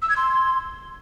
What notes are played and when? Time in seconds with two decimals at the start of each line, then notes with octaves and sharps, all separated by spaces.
0.02 E6
0.09 G#6
0.17 C6